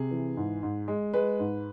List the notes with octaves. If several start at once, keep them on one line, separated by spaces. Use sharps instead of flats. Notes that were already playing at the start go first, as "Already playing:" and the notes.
Already playing: C3 G#4
E3
G#2
G#2
G#3
G#3 B4
G#2